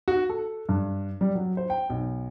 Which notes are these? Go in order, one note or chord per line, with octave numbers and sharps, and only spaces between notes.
F#4
A4
G2
G3
F#3
C5
G5
B1